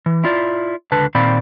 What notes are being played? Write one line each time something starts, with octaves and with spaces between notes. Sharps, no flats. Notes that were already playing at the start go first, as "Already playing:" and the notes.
E3
E4 F4 D5
C#2 D3 B4 A5
A#2 D#3 C4 D5 F5 B5